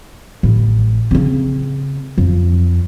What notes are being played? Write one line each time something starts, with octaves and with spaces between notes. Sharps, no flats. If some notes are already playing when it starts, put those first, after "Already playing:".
A1
C#3 C4
F2